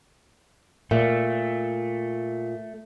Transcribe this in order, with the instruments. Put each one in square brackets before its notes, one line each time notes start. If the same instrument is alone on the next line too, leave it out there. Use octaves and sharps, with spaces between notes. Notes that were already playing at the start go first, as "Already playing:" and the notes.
[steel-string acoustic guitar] A#2 [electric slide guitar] A3